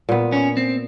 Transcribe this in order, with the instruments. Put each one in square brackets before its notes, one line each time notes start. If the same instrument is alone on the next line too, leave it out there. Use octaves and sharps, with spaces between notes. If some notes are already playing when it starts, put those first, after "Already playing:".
[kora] A#2 B3
[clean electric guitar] C#4
C4